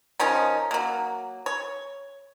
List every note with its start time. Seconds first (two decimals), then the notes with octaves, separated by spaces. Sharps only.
0.19 D#3 F3 C#4 D#4
0.71 F#3 A#3
1.46 C#5